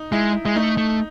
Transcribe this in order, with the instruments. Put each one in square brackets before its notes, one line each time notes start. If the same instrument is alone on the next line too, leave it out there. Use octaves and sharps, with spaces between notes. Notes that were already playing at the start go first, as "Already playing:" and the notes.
Already playing: [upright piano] D#4
[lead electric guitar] G#3 [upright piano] E4
[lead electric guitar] G#3 [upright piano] E4
[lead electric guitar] A3 [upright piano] D#4
[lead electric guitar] A3